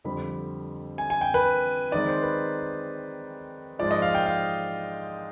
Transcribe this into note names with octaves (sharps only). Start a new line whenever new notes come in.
F2 D3 G3 C4 B5
G#5
G#5
G5
B4
D#3 G#3 C4 D#4 D5
C5
B4
G#2 F3 G#3 D5
D#5
F5
G5
F5